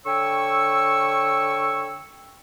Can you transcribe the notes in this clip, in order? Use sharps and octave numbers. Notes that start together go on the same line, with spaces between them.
D3 C#5 G5 C#6 E6